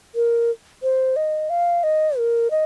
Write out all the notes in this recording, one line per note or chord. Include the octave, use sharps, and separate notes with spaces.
A#4
C5
D#5
F5
D#5
A#4
D#5